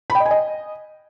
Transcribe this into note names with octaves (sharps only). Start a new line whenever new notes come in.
B5
G5
D#5
G#5
D#5